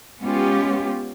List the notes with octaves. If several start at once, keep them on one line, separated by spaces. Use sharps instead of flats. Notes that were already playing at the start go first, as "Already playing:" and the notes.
G#3 B3 C#4 F4 G4